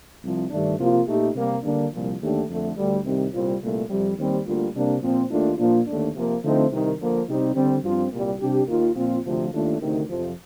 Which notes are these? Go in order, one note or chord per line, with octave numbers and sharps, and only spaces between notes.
C2 C3 F3
G2 D#3 A3 D4
C3 F3 A#3 F4
A#2 A3 D#4 G4
C3 G3 A#3
D3 G3 A#3 D4
C2 A#2 F3
D#2 D3 A3 D4 G4
F2 D3 A3
D2 D3 G3
C2 C3 D#3 G3 C4
C2 A#2 G3 C4 F4
C2 A#2 A3
F2 C3 G3
D#2 D#3 G3 C4
D2 D3 G3 A#3 F4
C3 G3 A#3 D4
A#2 F3 C4
D#2 D#3 A3 D4 F4
A#2 F3 A#3 D4 F4
D#2 D3 A3 D4
C3 F3 A#3
D3 F3 A3 C4 D#4
C2 C3 D#3
D3 F3 A#3
C3 G3 C4 D#4 G4
D3 G3 C4
G2 F3 C4 F4
C2 A#2 G3
C3 G3 D4 G4
D#2 D#3 A#3 F4
A#2 F3 C4 F4
D2 C3 F3
D#2 D#3 A3 D4 F4
D2 C3 D#3
F2 C3 F3